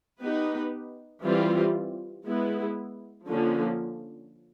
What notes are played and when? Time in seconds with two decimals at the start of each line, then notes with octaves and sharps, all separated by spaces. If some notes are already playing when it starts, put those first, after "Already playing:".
0.22 B3 D#4 G4 B4
1.23 E3 G3 C4 F4
2.25 G#3 B3 E4
3.26 D3 F3 A#3 C#4